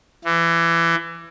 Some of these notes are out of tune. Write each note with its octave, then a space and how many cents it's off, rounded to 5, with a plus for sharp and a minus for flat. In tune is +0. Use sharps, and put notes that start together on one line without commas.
E3 +25